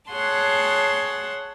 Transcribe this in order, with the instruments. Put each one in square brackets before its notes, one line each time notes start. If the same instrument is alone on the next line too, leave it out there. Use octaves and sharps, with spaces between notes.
[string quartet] G#4 C#5 F#5 A5 C6